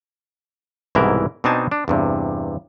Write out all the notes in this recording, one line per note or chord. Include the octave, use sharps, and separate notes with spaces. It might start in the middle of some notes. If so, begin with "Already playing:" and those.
C2 G#2 B2 E3 E4 A#4
B2 C4 D4 D#4 G#5 A5
D4
E2 G2 C3